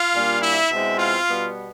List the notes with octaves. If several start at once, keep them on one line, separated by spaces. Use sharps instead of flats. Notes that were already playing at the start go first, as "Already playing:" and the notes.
Already playing: F4 F5
A#2 G3 A#3 D4
E4 E5
B2 G#3 C4 E4
F4 F5
B2 G3 B3